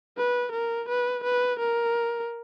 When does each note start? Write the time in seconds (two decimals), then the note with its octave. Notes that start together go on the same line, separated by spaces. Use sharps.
0.18 B4
0.52 A#4
0.89 B4
1.24 B4
1.59 A#4